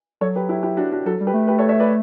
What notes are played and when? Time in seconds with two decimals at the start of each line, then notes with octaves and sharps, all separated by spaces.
0.21 F#3 A4 C#5
0.36 G4 B4
0.49 E4 G4
0.63 E4 G4
0.77 D4 F#4
0.92 D4 F#4
1.06 F#3 F#4 A4
1.20 G3
1.27 G4 B4
1.34 A3
1.47 G4 B4
1.58 A4 C#5
1.69 C#5 E5
1.80 B4 D5